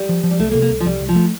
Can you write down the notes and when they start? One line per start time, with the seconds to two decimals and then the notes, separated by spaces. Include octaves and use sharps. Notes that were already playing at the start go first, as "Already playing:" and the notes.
Already playing: G3
0.09 F3
0.24 F3
0.31 G3
0.39 C2 A3
0.51 A#3
0.54 C3
0.62 A#3
0.70 C2
0.80 F3
0.85 C2 G3
1.01 C2
1.09 F3
1.16 A3